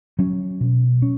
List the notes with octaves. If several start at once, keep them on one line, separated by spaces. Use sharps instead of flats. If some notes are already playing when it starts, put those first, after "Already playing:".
F#3 C#4
B2
C#4